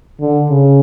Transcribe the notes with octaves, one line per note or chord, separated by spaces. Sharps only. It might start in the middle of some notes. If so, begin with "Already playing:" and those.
D3
C#3